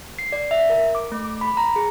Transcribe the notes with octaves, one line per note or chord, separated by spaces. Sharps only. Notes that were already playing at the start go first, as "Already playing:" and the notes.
C7
D5
E5
A#4
D6
A3
D6
B5
A#5
G#4